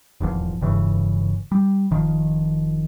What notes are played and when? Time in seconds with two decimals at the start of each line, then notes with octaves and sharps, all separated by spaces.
0.20 D#1 G#1 E2 F3
0.61 F1 G2 C#3 E3
1.52 G3
1.91 F1 D#3 F3